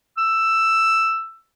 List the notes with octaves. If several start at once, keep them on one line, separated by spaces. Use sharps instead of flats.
E6